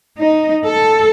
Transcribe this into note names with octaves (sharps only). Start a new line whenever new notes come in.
D#4
A4